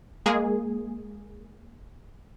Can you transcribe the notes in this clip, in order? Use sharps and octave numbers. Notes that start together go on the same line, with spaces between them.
G#3 A#3 G#4